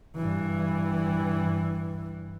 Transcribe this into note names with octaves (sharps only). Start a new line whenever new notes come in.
G2 E3